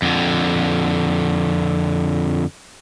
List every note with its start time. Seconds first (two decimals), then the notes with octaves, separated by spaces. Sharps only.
0.02 F2 D3